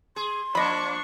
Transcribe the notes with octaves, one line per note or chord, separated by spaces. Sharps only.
G#4 C6
F3 A#3 D4 D#5 B5 C#6